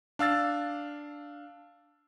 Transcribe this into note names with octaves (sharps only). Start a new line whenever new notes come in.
D4 F5 E6 A6